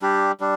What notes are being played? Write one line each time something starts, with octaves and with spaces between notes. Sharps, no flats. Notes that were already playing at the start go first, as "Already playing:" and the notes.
G3 D4 G4
G3 D4